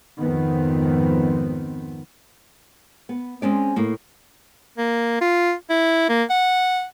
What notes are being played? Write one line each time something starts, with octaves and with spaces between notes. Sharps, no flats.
G#1 F2 D#3 B3 C4
B3
G#3 C4 C#4 D5
A2 A#3
A#3
F4
E4
A#3
F#5